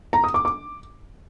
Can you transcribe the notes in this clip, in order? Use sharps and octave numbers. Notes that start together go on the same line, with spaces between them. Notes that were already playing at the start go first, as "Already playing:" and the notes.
A#5
D#6
D6
D6